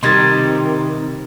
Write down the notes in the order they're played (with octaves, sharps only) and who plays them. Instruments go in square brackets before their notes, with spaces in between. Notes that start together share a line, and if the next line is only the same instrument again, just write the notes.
[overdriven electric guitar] C3 [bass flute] D#3 [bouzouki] G3 A#4 D#5 [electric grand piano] C6 G#6 A6